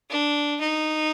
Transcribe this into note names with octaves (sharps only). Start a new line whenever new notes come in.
D4
D#4